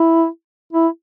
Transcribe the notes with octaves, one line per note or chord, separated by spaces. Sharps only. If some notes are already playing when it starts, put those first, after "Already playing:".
Already playing: E4
E4